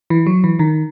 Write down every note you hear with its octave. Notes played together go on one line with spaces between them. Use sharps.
E3
F#3
E3
D#3